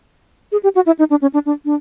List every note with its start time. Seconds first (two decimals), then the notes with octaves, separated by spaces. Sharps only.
0.52 G#4
0.63 G4
0.75 F#4
0.86 E4
0.99 D#4
1.10 D4
1.22 C#4
1.34 D4
1.46 D4
1.65 D4